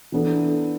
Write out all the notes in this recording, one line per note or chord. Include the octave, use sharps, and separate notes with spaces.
E3 B3 D4 A4